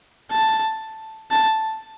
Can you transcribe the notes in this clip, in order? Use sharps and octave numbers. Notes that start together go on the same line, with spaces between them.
A5
A5